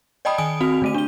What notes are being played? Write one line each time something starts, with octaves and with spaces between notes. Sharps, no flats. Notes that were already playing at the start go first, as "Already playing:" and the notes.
D5 D#5 G5 A5 B5 D#6
D#3 G#5 D#6 D7
C4 F#4 F7
D3 A3 D#7
D4 G7